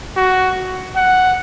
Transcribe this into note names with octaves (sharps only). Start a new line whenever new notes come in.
F#4
F#5